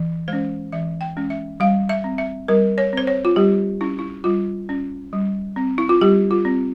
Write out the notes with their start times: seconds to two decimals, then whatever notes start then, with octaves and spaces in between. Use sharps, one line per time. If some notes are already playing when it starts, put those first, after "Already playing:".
Already playing: E3
0.28 G#3 C#4 C5
0.72 E3 E5
1.01 G5
1.17 G#3 C#4
1.30 E5
1.60 G3 F5
1.89 E5
2.04 C4
2.18 E5
2.48 G3 A#4
2.78 C#5
2.93 C4 C5
3.07 C#5
3.25 F4
3.36 G3 G4
3.81 C#4 E4
3.99 E4
4.24 G3 F4
4.69 C#4
5.13 G3
5.56 C4
5.78 E4
5.89 F4
6.01 G3 G4
6.31 F4
6.45 C4